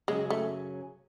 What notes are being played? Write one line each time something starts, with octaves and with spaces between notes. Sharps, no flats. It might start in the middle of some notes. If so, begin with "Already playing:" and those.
F#2 C#3 F#3 G#3 C#4 G#4
A3